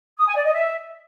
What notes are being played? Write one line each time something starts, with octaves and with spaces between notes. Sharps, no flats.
D#6
G#5
D5
D#5
E5